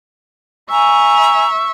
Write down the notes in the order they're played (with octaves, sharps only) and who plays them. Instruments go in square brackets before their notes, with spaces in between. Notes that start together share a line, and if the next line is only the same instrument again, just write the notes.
[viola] E5 [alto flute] G#5 [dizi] A#5 [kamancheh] C#6